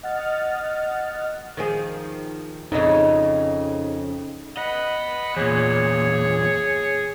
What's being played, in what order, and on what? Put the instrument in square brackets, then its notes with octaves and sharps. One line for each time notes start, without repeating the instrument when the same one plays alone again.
[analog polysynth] D#5 F#5 F6 A6
[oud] D#3 F3 G#4
[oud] F2 C#3 [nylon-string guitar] D#4 D#5
[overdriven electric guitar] D#5 [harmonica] F#5 B5
[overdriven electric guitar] E2 A#2 [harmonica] G#4 C#5